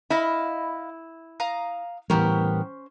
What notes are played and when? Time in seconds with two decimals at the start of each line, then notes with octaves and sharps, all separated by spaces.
0.10 E4 D#5 F5 B5
1.40 F5 A#5 D#6
2.10 A2 E3 G3 B3 C#4 G4 A#4 C5